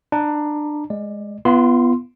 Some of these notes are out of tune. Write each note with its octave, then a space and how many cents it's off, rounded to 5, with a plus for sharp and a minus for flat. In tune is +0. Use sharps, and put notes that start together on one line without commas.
D4 +20 A#5 +20
G#3 +0 D5 +20
B3 +0 F4 -35 C6 +0